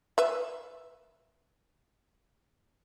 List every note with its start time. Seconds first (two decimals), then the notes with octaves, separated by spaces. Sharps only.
0.18 B4 E5